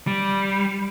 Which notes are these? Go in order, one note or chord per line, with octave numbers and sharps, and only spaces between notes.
G3